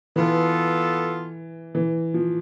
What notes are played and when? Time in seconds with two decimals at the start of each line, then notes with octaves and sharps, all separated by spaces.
0.16 E3 B3 F4 A4
1.75 E3
2.14 F3